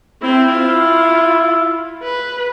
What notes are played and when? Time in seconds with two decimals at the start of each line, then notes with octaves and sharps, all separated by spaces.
0.22 C4 E4
0.52 F4
2.03 B4